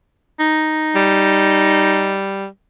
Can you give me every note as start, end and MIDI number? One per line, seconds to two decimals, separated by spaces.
0.40 2.19 63
0.96 2.46 55